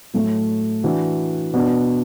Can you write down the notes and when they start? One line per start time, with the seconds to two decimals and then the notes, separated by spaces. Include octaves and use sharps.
0.14 A2 F#3 A3
0.83 E3 D4 F#4
1.54 B2 B3 D4 F#4